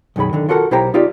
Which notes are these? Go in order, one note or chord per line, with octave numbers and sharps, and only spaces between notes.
B1 F#2 D#3 G#4 B5
D3 D#3
F4 F#4 A4 A#4 F#5
B1 E4 G4 C5 G5 A#5
D#4 F4 G4 D5